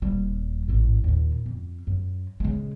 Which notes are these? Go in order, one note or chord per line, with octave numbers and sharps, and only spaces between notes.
D#1 G3
A1 G#2
D#2 A#2
F2
F#2
C#3 G#3